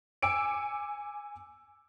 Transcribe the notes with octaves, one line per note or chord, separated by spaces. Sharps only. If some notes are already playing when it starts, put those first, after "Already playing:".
G#5 D6 E6 C#7 D7